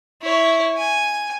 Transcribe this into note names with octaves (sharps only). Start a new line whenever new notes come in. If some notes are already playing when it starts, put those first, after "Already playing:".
E4 C#5
G#5